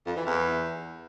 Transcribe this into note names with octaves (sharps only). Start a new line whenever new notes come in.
F2
E3
E2